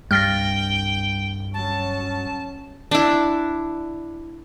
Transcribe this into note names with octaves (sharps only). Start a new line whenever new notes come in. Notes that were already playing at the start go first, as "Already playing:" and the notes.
C2 G2 G5 F6 A6 A#6
F#3 C#4 A5
D4 E4